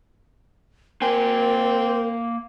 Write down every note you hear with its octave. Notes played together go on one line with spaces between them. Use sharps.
A#3 C4 A#4 G#5